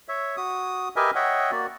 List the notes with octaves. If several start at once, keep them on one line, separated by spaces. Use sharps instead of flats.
C#5 E5
F#4 D#6
G4 A#4 B4 D#5 E5 G#5
C#5 D#5 E5 F#5 G5
A#3 F#4 D5